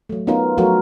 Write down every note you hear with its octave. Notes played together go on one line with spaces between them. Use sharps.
F#3 A3
B3 C#4 D#4 F4 A#4
F3 F#3 A3 F4 F#4 A#4